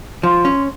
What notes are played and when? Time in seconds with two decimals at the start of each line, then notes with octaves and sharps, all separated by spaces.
0.23 F3 C6
0.45 C#4